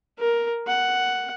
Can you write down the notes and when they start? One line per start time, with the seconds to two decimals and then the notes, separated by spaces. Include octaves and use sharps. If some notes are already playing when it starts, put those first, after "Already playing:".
0.19 A#4
0.67 F#5